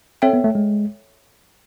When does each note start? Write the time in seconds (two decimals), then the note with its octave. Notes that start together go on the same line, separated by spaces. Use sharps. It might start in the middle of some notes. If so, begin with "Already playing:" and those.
0.22 C4 A4 C#5 E5 G5
0.33 B3
0.44 A3
0.55 G#3